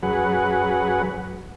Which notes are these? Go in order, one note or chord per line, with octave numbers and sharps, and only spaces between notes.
F#2 F#3 G#4 B4 F#5